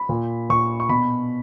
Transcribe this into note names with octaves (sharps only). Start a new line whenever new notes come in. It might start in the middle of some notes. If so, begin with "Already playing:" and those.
Already playing: B5
A#2
A#2 C#6
C#6
B2 B5